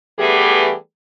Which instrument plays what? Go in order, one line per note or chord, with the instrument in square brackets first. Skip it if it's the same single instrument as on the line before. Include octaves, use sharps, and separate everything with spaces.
[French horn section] E3 G3 A3 B3 G4 G#4